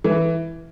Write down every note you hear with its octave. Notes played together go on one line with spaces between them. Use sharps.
E3